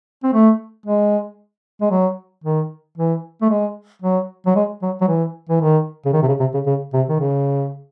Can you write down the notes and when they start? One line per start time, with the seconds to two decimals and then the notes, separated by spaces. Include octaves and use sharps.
0.24 C4
0.34 A3
0.86 G#3
1.81 G#3
1.91 F#3
2.44 D#3
2.98 E3
3.42 A3
3.50 G#3
4.02 F#3
4.46 F#3
4.56 G#3
4.82 F#3
5.01 F#3
5.08 E3
5.50 E3
5.62 D#3
6.06 C#3
6.13 D#3
6.23 C3
6.28 C#3
6.40 C3
6.54 C#3
6.67 C#3
6.93 C3
7.09 D#3
7.20 C#3